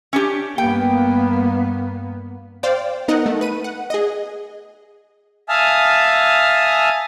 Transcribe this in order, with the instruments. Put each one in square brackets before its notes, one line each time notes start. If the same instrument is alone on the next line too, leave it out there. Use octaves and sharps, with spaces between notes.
[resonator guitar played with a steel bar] C#4 D4 G4
[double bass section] G2 A#3 B3 [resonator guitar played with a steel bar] G5
[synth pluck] C5 D5 F5 G5
B3 D#4 A#4 D#5 F#5
A3
B4 D#7
F#5
G#4 D#5
[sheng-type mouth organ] E5 F5 G#5 A5 D#6 F6